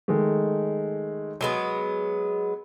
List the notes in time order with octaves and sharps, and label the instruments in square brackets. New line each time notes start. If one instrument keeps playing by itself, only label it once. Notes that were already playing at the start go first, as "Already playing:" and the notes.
[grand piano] D#3 G#3 A3
[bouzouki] F#3 G#3 B3 [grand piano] G7